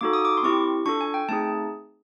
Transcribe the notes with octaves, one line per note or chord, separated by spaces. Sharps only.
A#3 D#4 F#4 A4 D6
D#6
D6
C6
C4 E4 G4 C#6
D4 F4 A4 C#6
G#5
G5
A3 C4 D#4 G#4 A5